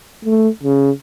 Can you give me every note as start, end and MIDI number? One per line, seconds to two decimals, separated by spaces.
0.25 0.49 57
0.63 0.90 49